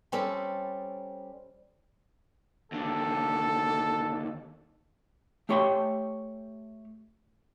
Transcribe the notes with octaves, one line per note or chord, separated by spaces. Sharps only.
G3 C4 C#4 A4 A5 B5
D#2 D3 A4
A3 G4 C#5 G5 C6